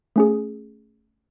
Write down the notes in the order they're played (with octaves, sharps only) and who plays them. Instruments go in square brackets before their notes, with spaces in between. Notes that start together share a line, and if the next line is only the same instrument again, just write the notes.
[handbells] A3 C#4 G#4